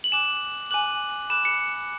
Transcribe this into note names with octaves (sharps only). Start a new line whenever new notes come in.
F#7
G#5 D6 F#6 E7
G#5 D6 F#6 F#7
B5 D6 F#6 E7
C#7